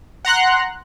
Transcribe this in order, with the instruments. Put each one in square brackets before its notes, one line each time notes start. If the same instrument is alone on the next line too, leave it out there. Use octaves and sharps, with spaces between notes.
[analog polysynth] F#5 A#5 C6 F#6